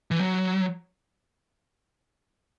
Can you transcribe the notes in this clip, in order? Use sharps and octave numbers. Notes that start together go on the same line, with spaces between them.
E3
F#3